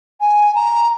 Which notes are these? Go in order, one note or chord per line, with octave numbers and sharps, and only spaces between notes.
G#5
A#5